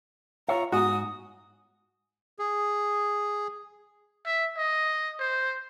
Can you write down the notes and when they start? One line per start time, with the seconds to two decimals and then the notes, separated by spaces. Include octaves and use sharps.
0.48 F4 C#5 E5 A#5
0.72 G#2 F#4 D#6
2.39 G#4
4.26 E5
4.57 D#5
5.19 C5